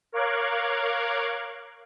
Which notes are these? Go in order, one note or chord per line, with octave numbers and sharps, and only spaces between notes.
A#4 C#5 F5 D6 F#6 G#6